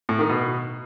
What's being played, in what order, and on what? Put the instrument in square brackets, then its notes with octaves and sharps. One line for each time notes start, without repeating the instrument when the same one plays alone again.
[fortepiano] A2
D#3
B2